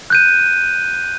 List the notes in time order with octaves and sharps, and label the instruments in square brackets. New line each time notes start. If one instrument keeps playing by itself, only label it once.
[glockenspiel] F#6 G6 D#7